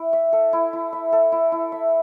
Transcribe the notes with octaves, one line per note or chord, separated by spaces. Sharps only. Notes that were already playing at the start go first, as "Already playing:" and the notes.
Already playing: E4
E5
A4
E4
E4
E5
A4
E4
E4
E5